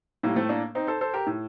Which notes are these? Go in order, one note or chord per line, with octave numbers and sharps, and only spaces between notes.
A2 G3 A#3
A3 C4
A#3 D4
C4 D#4
A4 C5
A4 C5
G4 A#4
A2